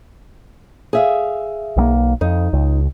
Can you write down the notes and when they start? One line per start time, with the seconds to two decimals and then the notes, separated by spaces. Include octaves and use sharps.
0.93 G#4 E5 F5
1.77 B1 G3 A#3
2.21 F2 D#4
2.53 C#2